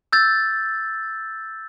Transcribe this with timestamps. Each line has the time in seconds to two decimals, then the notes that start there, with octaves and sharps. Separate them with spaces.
0.13 E6 G6 A6